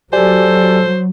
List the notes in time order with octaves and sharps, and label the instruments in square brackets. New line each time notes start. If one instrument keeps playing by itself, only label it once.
[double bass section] F#3 [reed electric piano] G4 D5 G#5 [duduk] A4 [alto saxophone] C5